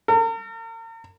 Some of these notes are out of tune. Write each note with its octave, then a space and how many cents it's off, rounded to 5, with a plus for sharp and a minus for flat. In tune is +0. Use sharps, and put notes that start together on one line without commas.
A#4 -45